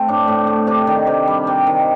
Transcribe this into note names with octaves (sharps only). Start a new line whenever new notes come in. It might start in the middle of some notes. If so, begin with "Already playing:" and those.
Already playing: A3 C4
A2 D4
A2
A3
C3 D4
D#3
C3
G3
C3
D#3